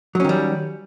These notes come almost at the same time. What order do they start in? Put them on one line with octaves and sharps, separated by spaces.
F#3 C#4 D#3 G3